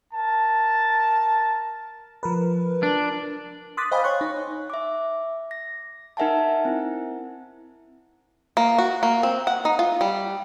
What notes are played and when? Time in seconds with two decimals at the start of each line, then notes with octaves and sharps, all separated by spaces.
0.13 A#4 A5
2.23 F3 A#4 B4
2.83 D4
3.77 C6 D6 D#6 F#6 A6 B6
3.91 C5 D#5 F5 G5 G#5 B5
4.04 C#5 G#5 C6 C#6 F#6
4.21 D#4
4.70 E5 D6
5.51 A#6
6.17 D#4 A#4 E5 F#5 G#5 A5
6.65 C4 E4
8.57 A#3
8.78 F#4
9.03 A#3
9.23 C4
9.47 F#5
9.65 D#4
9.79 F4
10.01 G3